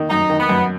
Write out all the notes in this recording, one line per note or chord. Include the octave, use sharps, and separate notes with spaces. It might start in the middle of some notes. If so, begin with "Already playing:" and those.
Already playing: D#3 A#3
F#2 D#4
D#3
B3
F#2